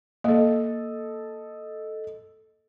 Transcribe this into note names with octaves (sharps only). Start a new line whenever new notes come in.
A#3 A4 D#5